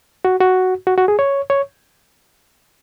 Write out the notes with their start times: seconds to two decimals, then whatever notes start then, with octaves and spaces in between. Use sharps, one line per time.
0.25 F#4
0.40 F#4
0.87 F#4
0.98 F#4
1.08 G#4
1.19 C#5
1.50 C#5